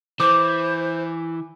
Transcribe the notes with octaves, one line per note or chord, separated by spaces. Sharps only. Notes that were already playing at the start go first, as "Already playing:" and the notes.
E3 C5 D6